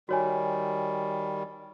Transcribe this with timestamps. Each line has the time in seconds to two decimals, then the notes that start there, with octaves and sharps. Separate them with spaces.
0.09 D#3 G3 F#4 C#5 G#5